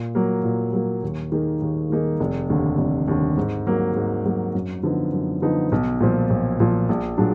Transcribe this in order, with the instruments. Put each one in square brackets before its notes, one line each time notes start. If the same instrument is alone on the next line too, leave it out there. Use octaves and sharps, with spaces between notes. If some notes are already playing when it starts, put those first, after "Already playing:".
Already playing: [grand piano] A#2
F#3 A#3
A#2
F#3 A#3
D#2
D#3 A#3 D#4 G#4
D#2
D#3 A#3 D#4 G#4
F1
D#2 D3
F1
D#2 D3
G#2
F#3 A#3
G#2
F#3 A#3
F#2
D3 F3 B3 D#4
F#2
D3 F3 B3 D#4
B1
A#2 F3
B1
A#2 F3
A#1
A#2 F#3 D4 G#4